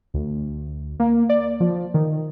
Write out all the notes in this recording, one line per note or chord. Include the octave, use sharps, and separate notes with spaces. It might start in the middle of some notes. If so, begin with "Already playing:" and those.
D2
A#3
D5
F3
D#3